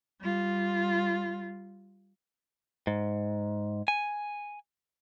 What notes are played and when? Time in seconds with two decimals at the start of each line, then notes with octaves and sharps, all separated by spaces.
0.21 G3 F4
2.87 G#2
3.88 G#5